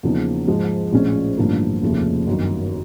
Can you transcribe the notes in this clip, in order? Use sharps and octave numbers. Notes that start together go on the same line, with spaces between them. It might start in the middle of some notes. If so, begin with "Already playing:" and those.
E2 C#3 F3 A#3 D#4
G#2 F3 G#3
A#1 A2 F3 G#3 C#4
A1 G2 D3 F3 A#3
F1 D#2 C#3 F3 A3
G1 F#2 D#3